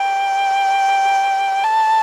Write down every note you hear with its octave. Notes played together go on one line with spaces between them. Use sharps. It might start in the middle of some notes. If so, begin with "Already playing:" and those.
Already playing: G5
A5